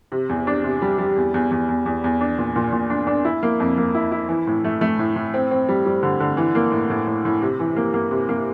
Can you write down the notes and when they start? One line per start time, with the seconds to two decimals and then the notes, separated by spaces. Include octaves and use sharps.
0.12 C3
0.29 E2
0.47 D4
0.64 C3
0.82 G3
0.99 G3
1.16 E2
1.34 E2
1.51 E2
1.69 E2
1.86 E2
2.04 E2
2.21 D4
2.38 A#2
2.56 A#2
2.72 A#2
2.90 D4
3.07 D4
3.25 E4
3.43 A#3
3.60 F2
3.77 A#3
3.95 E4
4.12 E4
4.29 E3
4.47 A2
4.64 A3
4.81 A3
4.99 A2
5.16 A2
5.34 C4
5.51 C4
5.69 G3
5.86 G3
6.03 D3
6.20 D3
6.37 E3
6.55 A#3
6.72 A2
6.90 A2
7.07 A2
7.25 A2
7.42 C3
7.60 E3
7.76 A#3
7.94 A#3
8.11 C3
8.29 A#3